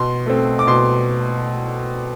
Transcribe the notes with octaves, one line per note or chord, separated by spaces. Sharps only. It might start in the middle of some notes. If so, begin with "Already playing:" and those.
Already playing: B2 C6
A3 C4
D6
B2 C6